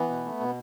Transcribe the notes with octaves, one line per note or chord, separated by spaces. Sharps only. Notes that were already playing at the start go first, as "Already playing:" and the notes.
Already playing: E3 B3
B2
A3
B2